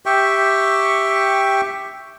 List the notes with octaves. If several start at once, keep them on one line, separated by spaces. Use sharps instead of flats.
G4 E5 G5 C#6